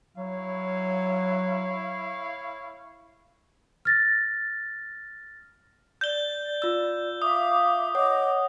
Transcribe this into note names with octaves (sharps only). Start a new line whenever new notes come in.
F#3 E4 C#5 F5
F6 A6 A#6
D5 G6 G7
F4 E6
E5 F5 D6 D#6
C#5 D#5 F#5 D6